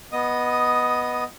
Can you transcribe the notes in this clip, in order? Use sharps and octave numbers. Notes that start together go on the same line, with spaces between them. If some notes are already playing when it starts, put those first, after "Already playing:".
B3 D#5 D#6